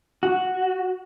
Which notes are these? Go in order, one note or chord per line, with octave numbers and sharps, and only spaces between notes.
F#4